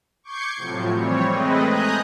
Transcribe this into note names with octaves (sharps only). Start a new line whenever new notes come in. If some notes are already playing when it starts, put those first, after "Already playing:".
C#6 D6 G6 G#6 C7 C#7
A2 C3 F3 F#3
E3 G3 C4 C#5
G#3 A3 C4 B4 D#5
G#5 A#5 D#6 F#6 G6 A#6